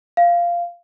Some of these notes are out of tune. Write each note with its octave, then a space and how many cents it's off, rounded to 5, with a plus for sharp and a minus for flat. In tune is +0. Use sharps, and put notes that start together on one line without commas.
F5 -10